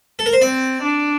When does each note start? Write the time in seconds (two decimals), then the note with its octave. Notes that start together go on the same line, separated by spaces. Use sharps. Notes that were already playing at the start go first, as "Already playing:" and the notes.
0.19 A4
0.26 A#4
0.33 C5
0.41 C4 D5
0.82 D4